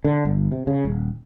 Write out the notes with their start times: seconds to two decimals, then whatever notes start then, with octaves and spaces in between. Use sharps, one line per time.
0.04 D3
0.25 G1
0.52 C3
0.67 C#3
0.85 D#1